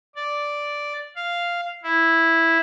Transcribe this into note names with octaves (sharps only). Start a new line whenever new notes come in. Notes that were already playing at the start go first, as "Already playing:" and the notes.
D5
F5
E4